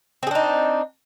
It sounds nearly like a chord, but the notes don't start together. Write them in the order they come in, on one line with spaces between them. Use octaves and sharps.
C4 G#4 D4 D#4